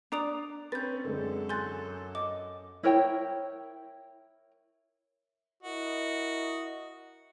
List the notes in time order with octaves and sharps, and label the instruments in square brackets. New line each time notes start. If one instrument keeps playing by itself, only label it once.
[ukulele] D4 D5 [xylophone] A#5 D#6 F7
[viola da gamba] C4 C#4 [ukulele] B4 [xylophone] G6 A6
[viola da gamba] F#2 A4 [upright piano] D3 G#3
[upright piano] G#5 F#6 [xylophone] C6 G6 A6
[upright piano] D#5 [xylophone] D6
[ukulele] E4 A#4 C#5 G5
[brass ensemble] E4 A#4 D#5 [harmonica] F#4